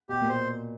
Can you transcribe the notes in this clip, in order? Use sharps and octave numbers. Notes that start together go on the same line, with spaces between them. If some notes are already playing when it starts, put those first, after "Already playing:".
B2 G4
A#2
C5